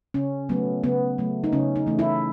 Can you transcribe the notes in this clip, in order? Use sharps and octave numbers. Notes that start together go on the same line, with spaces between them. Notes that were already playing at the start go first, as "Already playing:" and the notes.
C#3 C#4
F#3 A3 B3
C#3 B3
F#3 A3
D#4
C#3 C#4
D#4
E3 A3
E4